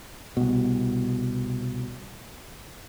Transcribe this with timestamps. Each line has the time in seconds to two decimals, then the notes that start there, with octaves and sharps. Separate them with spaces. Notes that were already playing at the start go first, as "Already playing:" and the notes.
0.37 C2 B2